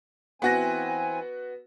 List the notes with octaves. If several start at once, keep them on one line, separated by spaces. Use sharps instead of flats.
E3 B3 C4 F#4 G#5 A#6